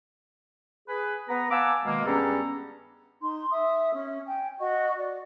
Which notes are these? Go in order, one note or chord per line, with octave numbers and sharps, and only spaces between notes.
G#4 B4
B3 B4 A#5
F5 F#5 G#5 A5 D6 E6
B2 D#3 G#3 A#3
G2 B3 C#4 G#4 A4 A#5
D#4 C6
E5 D#6
C#4
G5 G#5
F#4 D#5 C#6
D5